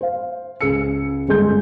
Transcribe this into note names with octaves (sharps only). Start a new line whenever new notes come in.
C5 F5
C#2 G#4 E6 C#7
G1 G#3 G#4 C6 G6